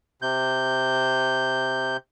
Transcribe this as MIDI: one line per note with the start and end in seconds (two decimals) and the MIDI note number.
0.22 1.97 48
0.22 1.97 91